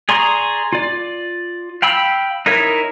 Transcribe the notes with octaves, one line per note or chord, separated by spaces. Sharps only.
G#4 D5 A#5 C6 C#6
F4 D5
F5 G5 B5 E6
D#4 E4 A#4 C#5 E5